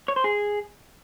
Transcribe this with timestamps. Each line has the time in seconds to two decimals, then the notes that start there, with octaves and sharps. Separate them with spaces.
0.08 C#5
0.16 C5
0.24 G#4